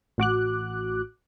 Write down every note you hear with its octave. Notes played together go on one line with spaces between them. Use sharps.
A1 F#4 D6 F#6